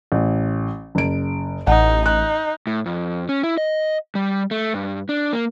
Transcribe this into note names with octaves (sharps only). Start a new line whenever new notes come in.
A1
F#1 D7
A1 D#4 F#5
D#4 F#6
A2
F2
C#4
E4
D#5
G3
A3
G2
D4
A#3